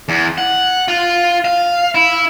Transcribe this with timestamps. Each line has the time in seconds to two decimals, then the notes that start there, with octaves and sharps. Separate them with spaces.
0.09 E2
0.38 F#5
0.88 F4
1.45 F5
1.95 E4